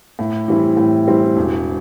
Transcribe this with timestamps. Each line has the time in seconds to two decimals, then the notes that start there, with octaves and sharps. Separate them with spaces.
0.19 A2
0.48 E3 G3 C4 E4
0.77 A2
1.07 E3 G3 C4 E4
1.36 E1